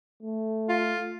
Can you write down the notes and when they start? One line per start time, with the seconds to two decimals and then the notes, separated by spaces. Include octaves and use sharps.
0.23 A3
0.69 F4